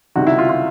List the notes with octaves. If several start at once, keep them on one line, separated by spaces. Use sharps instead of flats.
C#2 C3 D#3 G3 F#4
E4
F4
F4